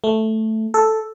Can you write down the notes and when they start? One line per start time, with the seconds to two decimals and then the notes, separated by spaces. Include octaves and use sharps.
0.04 A3
0.74 A4